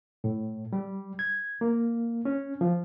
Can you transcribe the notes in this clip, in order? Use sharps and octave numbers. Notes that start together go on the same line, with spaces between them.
A2
G3
G#6
A#3
C#4
F3